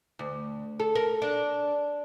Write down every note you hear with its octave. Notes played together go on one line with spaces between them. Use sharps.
D2
A4
A#4
D4